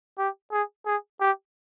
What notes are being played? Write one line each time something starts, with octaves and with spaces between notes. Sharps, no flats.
G4
G#4
G#4
G4